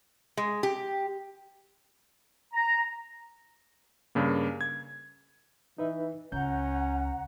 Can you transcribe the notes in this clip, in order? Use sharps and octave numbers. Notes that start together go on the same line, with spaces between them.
G#3
G4
A#5
G2 C#3 A#3
G#6
E3 D#4 B4 E5
C#2 C#4 F#5 A#5 G6